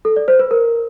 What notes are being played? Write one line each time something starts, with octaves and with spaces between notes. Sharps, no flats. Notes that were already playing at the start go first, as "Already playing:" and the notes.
A4
D5
C5
B4
A#4